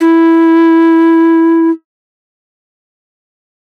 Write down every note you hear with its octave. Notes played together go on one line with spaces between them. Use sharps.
E4